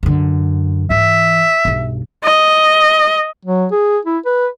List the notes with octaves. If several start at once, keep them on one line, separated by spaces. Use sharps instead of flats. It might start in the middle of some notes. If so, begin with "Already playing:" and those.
F#2 D3
G#2 E3 E5
B1 G2
D#5
F#3
G#4
E4
B4